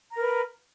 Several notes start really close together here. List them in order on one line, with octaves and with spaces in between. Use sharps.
A#5 A#4 B4